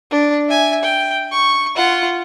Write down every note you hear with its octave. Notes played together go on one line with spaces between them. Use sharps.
D4
E5 G#5
G5
C#6
F4 F#5